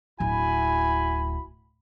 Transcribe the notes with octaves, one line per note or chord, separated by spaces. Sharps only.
D1 E4 F#4 G#5 B5